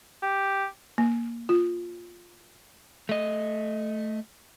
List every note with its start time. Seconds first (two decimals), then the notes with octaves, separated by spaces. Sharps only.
0.22 G4
0.98 A#3
1.49 F4
3.09 A3 D#5